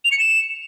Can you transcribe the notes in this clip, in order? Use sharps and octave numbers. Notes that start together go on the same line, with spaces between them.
F7
C#7
E7